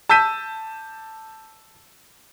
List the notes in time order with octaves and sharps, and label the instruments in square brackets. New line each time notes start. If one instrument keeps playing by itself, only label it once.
[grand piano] A5 E6 G6 B6 D#7